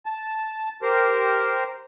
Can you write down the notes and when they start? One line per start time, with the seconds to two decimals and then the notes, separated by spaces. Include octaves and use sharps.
0.06 A5
0.82 G4 A#4 C5